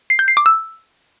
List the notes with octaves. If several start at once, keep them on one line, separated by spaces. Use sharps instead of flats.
C7
G6
C7
D6
E6